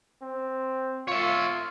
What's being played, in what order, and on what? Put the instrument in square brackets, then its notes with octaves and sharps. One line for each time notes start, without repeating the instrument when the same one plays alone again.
[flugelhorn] C4
[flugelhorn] F4 [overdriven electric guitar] C#5 E5